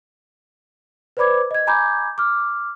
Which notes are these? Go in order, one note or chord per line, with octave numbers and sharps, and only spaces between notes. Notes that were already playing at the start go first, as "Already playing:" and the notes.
B4 C5 D5 B5 D6 G#6
D#5 G#6
G#5 A#5 B5 D6 G6 G#6
D6 F6